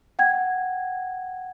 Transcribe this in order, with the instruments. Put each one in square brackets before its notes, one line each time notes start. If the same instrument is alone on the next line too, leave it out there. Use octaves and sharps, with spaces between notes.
[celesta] F#5 G5 G#6